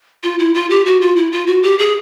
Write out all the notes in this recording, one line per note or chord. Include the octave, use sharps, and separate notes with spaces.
F4
E4
F4
G4
F#4
F4
E4
F4
F#4
G4
G#4